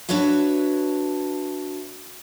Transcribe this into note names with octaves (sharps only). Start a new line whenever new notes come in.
D4 F#4 B4 C#5 E5